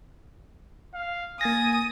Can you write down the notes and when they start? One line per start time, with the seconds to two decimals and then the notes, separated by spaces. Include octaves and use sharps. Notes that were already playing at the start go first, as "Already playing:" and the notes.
0.94 F5
1.41 A#3 G#5 D#6 A6 A#6